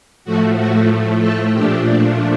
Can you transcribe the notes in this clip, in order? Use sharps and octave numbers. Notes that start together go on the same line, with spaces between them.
A2 F3 A3 F#4
F#4
A4
A#2 F3 A3 D4 G4